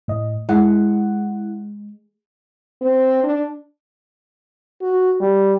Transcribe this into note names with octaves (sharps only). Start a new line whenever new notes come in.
A2 D#5
G#3 E4 F#5
C4
D4
F#4
G3